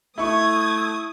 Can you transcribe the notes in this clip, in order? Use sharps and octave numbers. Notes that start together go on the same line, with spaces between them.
A3 E4 C#6 D#6 G#6